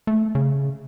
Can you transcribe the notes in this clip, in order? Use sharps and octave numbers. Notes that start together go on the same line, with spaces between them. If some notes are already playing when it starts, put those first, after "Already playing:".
A3
C#3